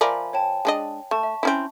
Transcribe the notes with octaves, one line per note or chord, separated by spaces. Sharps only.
F3 A#4 D5 E5 G#5 B5
C#5 G5 A5
G#3 D4 D#5
A3 A5 C#6
E5
C4 C#4 E4